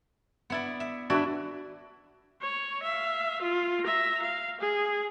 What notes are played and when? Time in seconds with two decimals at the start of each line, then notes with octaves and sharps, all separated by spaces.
0.50 B3 E4 D5
0.80 E5
1.10 D4 E4 F#4 B4 D5 E5
2.42 C#5
2.83 E5 F5
3.42 F4
3.84 E5 A#5
4.22 F5
4.60 G#4